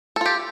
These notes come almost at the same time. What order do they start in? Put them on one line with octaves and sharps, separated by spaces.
A4 F4 G4